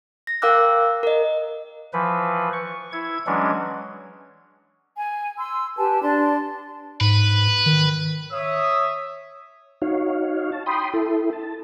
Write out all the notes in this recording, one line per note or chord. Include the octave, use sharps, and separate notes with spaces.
A#6
A#4 F5 G5 D6 E6 F#6
A#4 D#5
E3 F3 B4
C#6
E4 G#6
E3 F#3 G#3 C#4 D4
G#5
C6 E6
G4 B4 G#5 A5
D4 D5 A5 C6
G#2 B4
D#3
C#5 E5 D#6
D#4 F#4 C#5 F5
A5
G5 B5 C6 D#6
E4 A4
A5